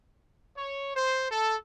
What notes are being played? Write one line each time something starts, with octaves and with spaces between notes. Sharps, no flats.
C#5
C5
A4